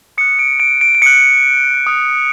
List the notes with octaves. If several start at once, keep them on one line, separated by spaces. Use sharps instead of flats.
D#6 F#6 C#7
D7
D7
D7
D7
D#6 F#6 C#7
D#6 F#6